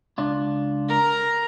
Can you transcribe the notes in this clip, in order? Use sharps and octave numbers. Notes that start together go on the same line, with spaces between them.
C#2 D4 F4
A#4 A#5